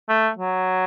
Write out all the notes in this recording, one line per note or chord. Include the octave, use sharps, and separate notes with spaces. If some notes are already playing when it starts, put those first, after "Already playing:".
A3
F#3